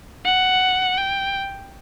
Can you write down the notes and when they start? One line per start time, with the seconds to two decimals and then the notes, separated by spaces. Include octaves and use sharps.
0.25 F#5
0.98 G5